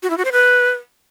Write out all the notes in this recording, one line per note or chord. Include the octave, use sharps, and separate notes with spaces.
F#4
E4
F#4
C5
B4